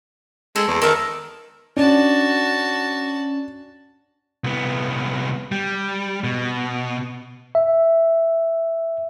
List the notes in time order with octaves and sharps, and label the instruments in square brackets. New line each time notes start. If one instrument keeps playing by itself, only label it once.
[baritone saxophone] G#3 [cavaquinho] A4
[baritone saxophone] E2
[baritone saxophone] D#3 [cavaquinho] A4 F5
[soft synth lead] C#4 [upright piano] D4 [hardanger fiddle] F#4 A5
[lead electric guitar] C2 B3
G3
B2
[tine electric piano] E5